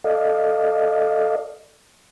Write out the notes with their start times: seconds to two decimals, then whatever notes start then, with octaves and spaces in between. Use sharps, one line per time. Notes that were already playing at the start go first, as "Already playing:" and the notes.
0.04 A4 D5 D#5 F5